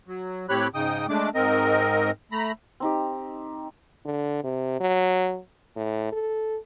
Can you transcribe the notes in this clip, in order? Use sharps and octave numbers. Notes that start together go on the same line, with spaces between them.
F#3
A2 C4 G4 C#5 B5 F#6
G#2 C#3 D#4 G5 D#6
G#3 A3 D4 D6
G#2 C4 A#4 D#5
A3 A#5 B5
C4 D#4 G4
D3
C3
F#3
A2
A4